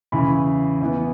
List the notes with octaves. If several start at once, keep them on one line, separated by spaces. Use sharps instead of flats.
E2 C#3 E3 B5
E2 E3 B3